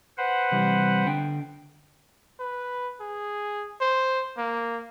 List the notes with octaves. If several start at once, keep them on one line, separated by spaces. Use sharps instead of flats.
B4 C5 F#5
C3 E3 G3
D3 G5
B4
G#4
C5
A#3